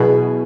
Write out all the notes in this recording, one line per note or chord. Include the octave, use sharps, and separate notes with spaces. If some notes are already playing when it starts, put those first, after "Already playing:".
Already playing: B2 F#3 B3 E4 G#4